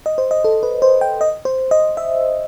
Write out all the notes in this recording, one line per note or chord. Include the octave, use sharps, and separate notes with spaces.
D#5
C5
D#5
A4
B4
C5
G5
D#5
C5
D#5
E5